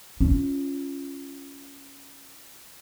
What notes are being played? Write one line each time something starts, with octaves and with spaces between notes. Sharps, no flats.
C#4 F4